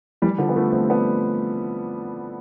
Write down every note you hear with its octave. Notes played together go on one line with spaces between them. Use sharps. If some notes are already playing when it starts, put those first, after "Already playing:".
E3 G3
D3 F3
B3
F3 A3
A3 C4
B3 D4